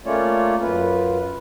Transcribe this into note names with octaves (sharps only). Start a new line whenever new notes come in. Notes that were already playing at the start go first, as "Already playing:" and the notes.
A3 A#3 C#4 F4 C#5 D5
F#2 F4 B4